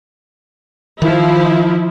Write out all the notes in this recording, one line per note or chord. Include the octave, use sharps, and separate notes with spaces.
D#3 F3 E4